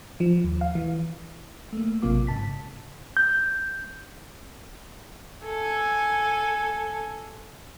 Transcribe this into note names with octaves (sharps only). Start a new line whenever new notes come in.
F3
D#2
F5
E3
A3 A#3
A1 C3 F#3 A#3 F4 D6
G#2 C#3 A5 B6
G6
A4 G#5